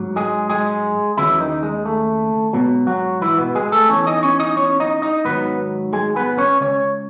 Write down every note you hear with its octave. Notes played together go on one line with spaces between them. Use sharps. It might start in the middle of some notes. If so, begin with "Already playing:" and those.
Already playing: G#2 F#3
G#3 G#4
G#3 G#4
D#2 C#3 E3 F#3 E4
D#3 D#4
G#3
A3
G#2 B2 F#3 B3
F#3 F#4
E3 E4
B2 B3
G#3 G#4
A3 A4
E2 C#3 E3 C#4 C#5
D#4 D#5
C#4 C#5
D#4 D#5
C#4 C#5
D#4 D#5
D#4 D#5
G#2 D#3 F#3 B3 B4
G#3 G#4
B3 B4
C#4 C#5
C#2 C#3 C#5